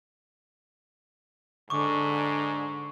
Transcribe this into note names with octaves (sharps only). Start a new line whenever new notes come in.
G#2 D3 C#6 D6